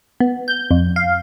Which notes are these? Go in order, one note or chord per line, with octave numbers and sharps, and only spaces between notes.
B3
G6
F2
F5